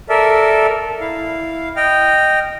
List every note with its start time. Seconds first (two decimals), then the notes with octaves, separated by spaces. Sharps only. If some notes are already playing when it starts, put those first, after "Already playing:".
0.09 A4 A#4 D5 E5
1.01 E4 F5
1.76 D#5 G5 F6